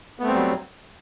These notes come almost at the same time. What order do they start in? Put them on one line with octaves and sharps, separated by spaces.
B3 A3 C4 G3 F#3